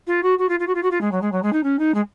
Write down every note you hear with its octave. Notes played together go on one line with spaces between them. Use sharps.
F4
F#4
F#4
F4
F4
F#4
F4
F#4
F4
G#3
F#3
G#3
F#3
G#3
D#4
C#4
D#4
G#3